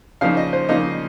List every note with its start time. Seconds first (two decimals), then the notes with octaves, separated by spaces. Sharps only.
0.21 C#3 F3 A#3 D#4 F5
0.37 D#5
0.53 C5
0.69 C#3 F3 A#3 D#4 D#5